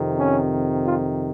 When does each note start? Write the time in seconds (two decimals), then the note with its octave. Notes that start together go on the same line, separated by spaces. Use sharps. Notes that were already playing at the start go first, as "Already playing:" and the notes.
Already playing: F2 C3 D#3
0.19 C#4
0.86 F4